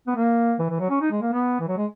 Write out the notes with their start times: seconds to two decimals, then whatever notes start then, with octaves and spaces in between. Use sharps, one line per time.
0.07 B3
0.16 A#3
0.59 E3
0.70 E3
0.80 F#3
0.90 C#4
1.02 D#4
1.11 G#3
1.22 A#3
1.33 B3
1.60 E3
1.68 F#3
1.77 G#3